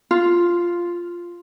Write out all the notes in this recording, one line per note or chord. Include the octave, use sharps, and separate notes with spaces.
F4